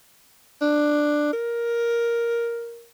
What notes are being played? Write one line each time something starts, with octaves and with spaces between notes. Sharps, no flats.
D4
A#4